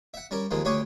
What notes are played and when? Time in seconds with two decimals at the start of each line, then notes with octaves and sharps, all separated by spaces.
0.14 E5 F#5
0.31 G3 C#4 A#4
0.51 D#2 D#3 F3 G#3
0.65 D2 C#4 G4 C#5 D#6